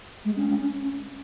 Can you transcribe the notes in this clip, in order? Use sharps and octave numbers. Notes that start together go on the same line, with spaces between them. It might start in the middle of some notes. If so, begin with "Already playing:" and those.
G#3
C#4
C#4
C#4